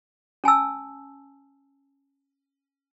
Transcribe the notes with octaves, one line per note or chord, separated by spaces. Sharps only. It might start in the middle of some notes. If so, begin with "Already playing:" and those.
C#4 G#5 A5 E6